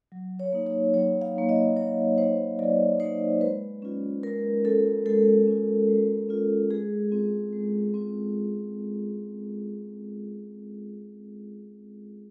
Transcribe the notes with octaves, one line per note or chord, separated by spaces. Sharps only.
F#3
C#5
A#3 D#4
C#5
F#3 C#5
F5
A#3 D#4
D#5
F#3 C#5
A#3 D#4 C5
F#3 D5
A#3 D#4 C5
G#3 B4
C#4 F4
G#3 A#4
C#4 F4 A4
G#3 A4
C#4 F4
G#3
C#4 F4
G#3 G#4
C4 F4
G#3
C4 F4